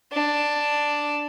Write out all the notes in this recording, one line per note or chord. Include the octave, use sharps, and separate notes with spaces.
D4